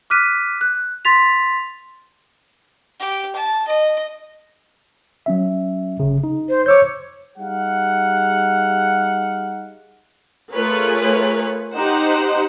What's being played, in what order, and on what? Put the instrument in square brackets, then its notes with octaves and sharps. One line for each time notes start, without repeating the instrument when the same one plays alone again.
[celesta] D6 F6 F#6 B6 D#7
F#6
C6 A6 B6 F7
[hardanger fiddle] G4
A5
D#5
[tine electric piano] F#3 C#4 E5
G1 C#3
D#4
[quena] C5
[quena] C#5 [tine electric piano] D6 E6 G6
[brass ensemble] G3 D#4 G#4 F5 F#5
[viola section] A3 F4 G#4 A#4 B4 C#5
D#4 G4 C5 F#5